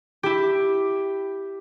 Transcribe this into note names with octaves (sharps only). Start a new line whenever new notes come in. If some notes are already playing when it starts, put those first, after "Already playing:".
E4 G4